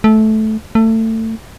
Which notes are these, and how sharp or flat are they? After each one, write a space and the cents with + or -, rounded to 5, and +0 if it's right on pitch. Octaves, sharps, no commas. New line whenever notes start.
A3 -15
A3 +25